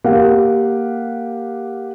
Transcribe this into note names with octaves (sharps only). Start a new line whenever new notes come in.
A#3 G4 F5 F#5